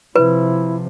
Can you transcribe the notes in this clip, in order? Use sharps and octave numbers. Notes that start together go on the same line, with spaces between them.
C3 F3 E4 B4